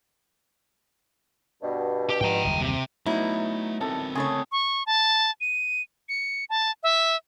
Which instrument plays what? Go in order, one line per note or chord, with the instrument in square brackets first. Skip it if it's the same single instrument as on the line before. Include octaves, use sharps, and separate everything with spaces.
[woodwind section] G2 B2
[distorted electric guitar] G4
[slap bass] G#2 F3 [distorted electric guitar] G5 A#5
[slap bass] F#1 D#2 G3
[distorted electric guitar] C3
[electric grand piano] F#3 B3 D#4 [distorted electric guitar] A3 A#5 [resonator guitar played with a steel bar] E4
[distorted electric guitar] C4 A#4 [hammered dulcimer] A4
[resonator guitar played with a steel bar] C#3 A3 C#5 [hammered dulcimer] G#4
[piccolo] C#6
A5
D#7
C#7
A5
E5